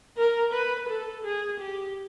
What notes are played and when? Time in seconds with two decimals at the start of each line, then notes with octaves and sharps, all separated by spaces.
0.17 A#4
0.53 B4
0.89 A4
1.24 G#4
1.60 G4